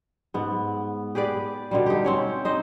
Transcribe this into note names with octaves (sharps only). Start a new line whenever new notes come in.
G#2 B3
G4 G#4 B4 D5
B2 D3 G3
D#4 G4
C4 C#4 C#5
D#4 C5 D#5